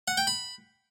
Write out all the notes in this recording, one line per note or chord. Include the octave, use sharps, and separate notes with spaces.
F#5
G5
B5